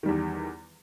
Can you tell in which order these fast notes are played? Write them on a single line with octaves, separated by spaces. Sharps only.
D#3 G3 E2